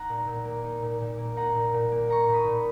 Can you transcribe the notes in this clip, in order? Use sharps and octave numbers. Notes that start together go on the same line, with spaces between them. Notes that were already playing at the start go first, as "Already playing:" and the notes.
Already playing: D#4 F#5 A#5
A#2
A#2
A#3
D#4
A#2
A#2
A#3
D#4 F#5 A#5
A#2
A#2
A#3
D#4 A#5 C#6
A#2
B5 D#6
A#2